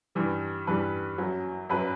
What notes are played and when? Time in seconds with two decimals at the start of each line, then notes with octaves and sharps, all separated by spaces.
0.15 G2 E3 G3
0.67 G2 E3 G3 B4
1.18 F#2 F#3
1.70 F#2 F#3 B4